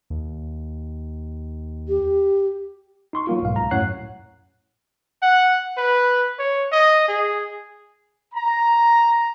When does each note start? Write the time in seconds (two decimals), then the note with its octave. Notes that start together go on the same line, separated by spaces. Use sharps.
0.10 D#2
1.88 G4
3.13 D#4 C6 C#6
3.27 F#3 A#3 F4
3.42 B1 G#2 F5
3.56 C#2 A#5
3.71 F#2 A2 C#5 F#5 F#6 C7
5.22 F#5
5.77 B4
6.39 C#5
6.72 D#5
7.08 G#4
8.34 A#5